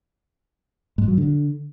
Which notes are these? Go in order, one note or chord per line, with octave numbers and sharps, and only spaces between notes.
G#2
F#3
D3